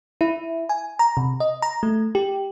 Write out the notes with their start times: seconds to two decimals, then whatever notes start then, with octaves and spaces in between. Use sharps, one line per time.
0.21 E4
0.69 G#5
0.99 A#5
1.17 C3
1.40 D#5
1.62 A#5
1.83 A3
2.15 G4